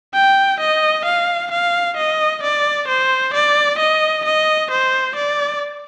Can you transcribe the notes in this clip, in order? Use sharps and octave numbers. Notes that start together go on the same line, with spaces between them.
G5
D#5
F5
F5
D#5
D5
C5
D5
D#5
D#5
C5
D5